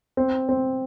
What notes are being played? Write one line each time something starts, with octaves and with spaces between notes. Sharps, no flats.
C4
C4